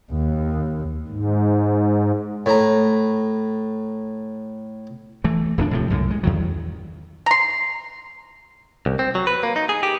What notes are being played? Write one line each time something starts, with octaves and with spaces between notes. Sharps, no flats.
D#2
G#2
A2 A#5
E3 A3
D#1 E2 D#3 D4
A2 C3 F3
C2 F#2 A2 D3
G#3
E2 D#3 F#3
A#5 C6
C2
C4
F#3
B4
A#3
D#4
G#4
G4